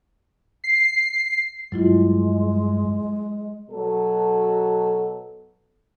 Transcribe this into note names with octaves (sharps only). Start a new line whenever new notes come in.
C7
G2 F#3 G#3 E4 F4
B2 F#3 A4